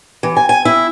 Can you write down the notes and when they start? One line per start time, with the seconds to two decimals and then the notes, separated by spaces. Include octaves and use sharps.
0.23 E3
0.37 G#5
0.49 G#5
0.65 E4